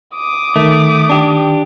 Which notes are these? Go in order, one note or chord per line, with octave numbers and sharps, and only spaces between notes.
D6 D#6
D#3 A3
D4 G4